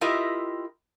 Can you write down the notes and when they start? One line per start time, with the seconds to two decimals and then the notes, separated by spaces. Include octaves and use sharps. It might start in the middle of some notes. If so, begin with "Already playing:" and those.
0.01 E4 F4 G4 A#4 D#5 E5